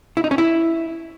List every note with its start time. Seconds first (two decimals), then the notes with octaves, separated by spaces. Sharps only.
0.17 E4
0.24 D#4
0.31 C#4
0.38 E4